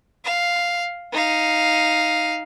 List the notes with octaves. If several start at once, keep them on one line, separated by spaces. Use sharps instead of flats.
F5
D#4 F5